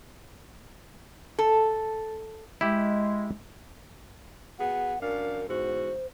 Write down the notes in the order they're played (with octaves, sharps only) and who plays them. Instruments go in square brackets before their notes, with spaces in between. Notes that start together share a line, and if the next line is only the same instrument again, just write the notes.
[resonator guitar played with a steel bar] A4
[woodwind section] G#3 [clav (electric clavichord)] E4 G4
[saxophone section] B3 F#4 G#4 [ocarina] F#5
[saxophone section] F#2 D4 F5 [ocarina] A#4
[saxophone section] E2 G#2 F#4 [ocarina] C5